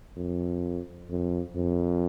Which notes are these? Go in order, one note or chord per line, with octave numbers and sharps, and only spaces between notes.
F2
F2
F2